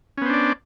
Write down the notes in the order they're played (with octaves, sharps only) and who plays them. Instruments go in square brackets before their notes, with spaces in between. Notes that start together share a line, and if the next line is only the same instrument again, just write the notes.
[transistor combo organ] C#4
B3
C5
D4
D5